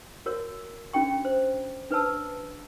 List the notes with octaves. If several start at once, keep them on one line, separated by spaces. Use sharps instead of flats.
F#4 A#4 C#5
C#4 D4 F#4 G5 C#6
C5
D4 B4 C#5 A5 E6